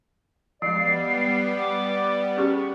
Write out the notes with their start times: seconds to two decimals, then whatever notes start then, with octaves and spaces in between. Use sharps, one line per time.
0.62 F3 G3 G#3 B3 D5 C7
1.58 D6
2.37 C#4 G4 G#4 C#6